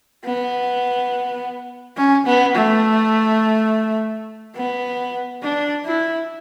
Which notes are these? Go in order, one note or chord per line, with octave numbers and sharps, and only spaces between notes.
B3
C#4
B3
A3
B3
D4
E4